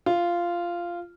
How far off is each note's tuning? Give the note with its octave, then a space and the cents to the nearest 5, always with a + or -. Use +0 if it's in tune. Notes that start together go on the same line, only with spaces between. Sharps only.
F4 -10